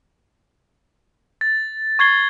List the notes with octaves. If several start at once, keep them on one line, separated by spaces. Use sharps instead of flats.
A6
C#6 G#6 C7 G7